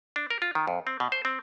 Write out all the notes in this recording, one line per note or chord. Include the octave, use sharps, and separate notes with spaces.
D4
A#4
F4
D#3
F2
C4
B2
C5
C4